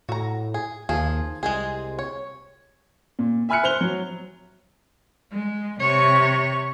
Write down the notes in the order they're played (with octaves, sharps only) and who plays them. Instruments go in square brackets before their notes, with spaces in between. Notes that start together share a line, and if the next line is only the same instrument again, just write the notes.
[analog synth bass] A2 [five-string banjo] F#4 A#5
[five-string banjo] G#4
[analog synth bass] D#2 [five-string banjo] F3 G#4
[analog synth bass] C2 [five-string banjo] G#3 C4 G#4
[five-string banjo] C#5
[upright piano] A#2
E5 G#5 B5 F6 F#6 C#7
C5 F#6 F7 G7
F#3
[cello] G#3
C3 C#5